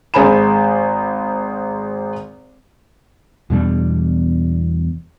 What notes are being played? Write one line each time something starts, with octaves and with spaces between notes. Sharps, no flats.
G#1 G#3 C5 G#5 B5 E7
E2 B2 G3 D4